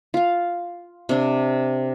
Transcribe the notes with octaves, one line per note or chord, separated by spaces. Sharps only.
F4 F5
C3 D4